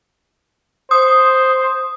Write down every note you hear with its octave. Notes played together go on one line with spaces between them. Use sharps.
C5 D#6